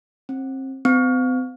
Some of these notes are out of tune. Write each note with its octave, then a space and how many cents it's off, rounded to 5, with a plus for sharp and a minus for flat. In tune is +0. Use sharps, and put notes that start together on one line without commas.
C4 +30
C4 -45